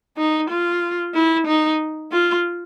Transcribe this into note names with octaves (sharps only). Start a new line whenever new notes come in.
D#4
F4
E4
D#4
F4